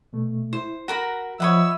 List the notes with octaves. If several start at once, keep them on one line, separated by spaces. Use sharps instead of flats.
B2 A3
E4 C5
F#4 A#4 F#5 B5
F3 C#5 D#5 E5 F#5 B5 E6